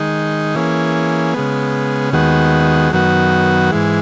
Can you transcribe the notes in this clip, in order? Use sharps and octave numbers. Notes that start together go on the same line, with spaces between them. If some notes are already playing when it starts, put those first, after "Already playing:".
Already playing: D#3 G#3 D#4
E3 A#3 C#4 G#4
C#3 G#3 B3
D#2 D#3 G#3 B3 F#4
F#2 D#3 F#3 B3 F#4
G#2 E3 G#3